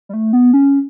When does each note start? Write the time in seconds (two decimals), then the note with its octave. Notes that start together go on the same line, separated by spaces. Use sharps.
0.09 G3
0.13 A3
0.33 B3
0.53 C#4